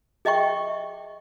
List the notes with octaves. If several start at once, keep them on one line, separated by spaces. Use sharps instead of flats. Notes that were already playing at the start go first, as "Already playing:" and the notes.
G#4 D#5 E5 G5 C#6